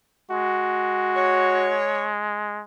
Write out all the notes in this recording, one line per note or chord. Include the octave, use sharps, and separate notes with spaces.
G#3 F#4
C#5